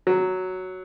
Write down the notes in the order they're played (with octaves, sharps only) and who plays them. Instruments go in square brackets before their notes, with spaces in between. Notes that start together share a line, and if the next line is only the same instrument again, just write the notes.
[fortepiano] F#3